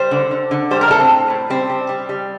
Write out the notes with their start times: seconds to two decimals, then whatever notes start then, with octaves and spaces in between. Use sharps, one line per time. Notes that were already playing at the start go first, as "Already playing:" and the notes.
Already playing: G3 C5
0.11 D3
0.31 D3
0.51 D3
0.71 G3 C5
0.81 A#4
0.90 A2 A4
1.00 C4
1.10 A2
1.30 A2
1.50 G3 C4
1.70 G3
1.89 G3
2.09 G3